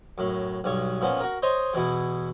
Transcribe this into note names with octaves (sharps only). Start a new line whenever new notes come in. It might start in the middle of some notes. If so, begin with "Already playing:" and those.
F#2 A2
B1 G2 C#5
A#2 F3 B3 C#4
F#4 A#4
C5 C#5 D#5
E2 B2 E4